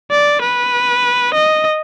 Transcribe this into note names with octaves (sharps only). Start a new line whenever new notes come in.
D5
B4
D#5